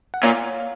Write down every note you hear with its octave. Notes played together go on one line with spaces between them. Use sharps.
F#5
A#2 C#5 F5